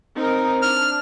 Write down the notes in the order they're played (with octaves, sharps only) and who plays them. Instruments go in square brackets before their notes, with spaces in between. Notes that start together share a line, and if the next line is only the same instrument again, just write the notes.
[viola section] C4 D#4 A#4
[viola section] D4 [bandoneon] F6